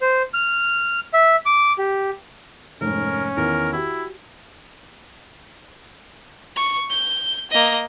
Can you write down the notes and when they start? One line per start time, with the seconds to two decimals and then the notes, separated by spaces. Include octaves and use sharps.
0.01 C5
0.34 F6
1.13 E5
1.46 D6
1.78 G4
2.81 F1 G#2 C#4 A#4
3.37 E2 D#3 A#4
3.73 E4 F#4 G4
6.56 C#6
6.90 G6
7.51 A#3 D#5